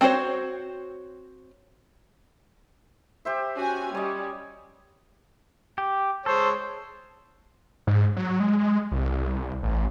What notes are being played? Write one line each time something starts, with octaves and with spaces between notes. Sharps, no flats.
C4 F#4 A4 C5 C#5
G4 C5 E5
C#4 F#4 G#5
G3 C#5 D#5
G4
G#3 A4 C5 C#5
G#2
F#3
G#3
C2
A1